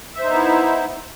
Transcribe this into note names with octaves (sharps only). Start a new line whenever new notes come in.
B3 D#4 E4 C5 E5